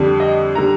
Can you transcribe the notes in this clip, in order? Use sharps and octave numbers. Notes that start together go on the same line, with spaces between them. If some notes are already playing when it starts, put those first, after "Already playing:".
Already playing: F2 D3 G3
D#5
D3 G3 A#5